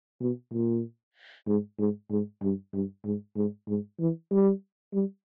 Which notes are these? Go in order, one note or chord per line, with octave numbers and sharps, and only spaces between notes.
B2
A#2
G#2
G#2
G#2
G2
G2
G#2
G#2
G#2
E3
G3
G3